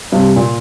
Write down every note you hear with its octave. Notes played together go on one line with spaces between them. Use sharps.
G2 C3
A#2